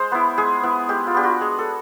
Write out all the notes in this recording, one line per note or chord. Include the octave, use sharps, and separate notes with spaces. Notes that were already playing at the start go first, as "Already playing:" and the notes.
Already playing: G#3 C5
B3 E4
G#3 G#4
B3 E4
G#3 G4
F4
B3 D4 G4
F#4
G#3 G#4
A4